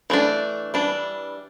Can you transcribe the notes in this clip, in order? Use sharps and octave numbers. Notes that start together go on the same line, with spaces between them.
E3 A3 D4
E3 G3 D4